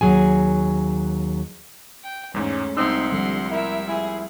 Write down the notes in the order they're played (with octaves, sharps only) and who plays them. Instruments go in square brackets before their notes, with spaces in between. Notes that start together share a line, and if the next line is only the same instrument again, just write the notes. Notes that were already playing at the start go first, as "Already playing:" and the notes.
[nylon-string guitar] D#2 C3 F#3 G#4 G#5
[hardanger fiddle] G5
[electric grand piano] E2 G#2 [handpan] G#3 A3 [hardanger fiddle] C#4
[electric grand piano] C2 C4 E6 [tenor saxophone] D#4 [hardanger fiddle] C6
[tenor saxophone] D3 [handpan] F3 G3 [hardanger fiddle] F#5 C6
[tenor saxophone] E4 [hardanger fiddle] A#4 E5
[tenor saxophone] E4 [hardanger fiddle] G#4